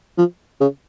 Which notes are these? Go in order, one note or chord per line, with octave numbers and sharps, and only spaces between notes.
F3
C#3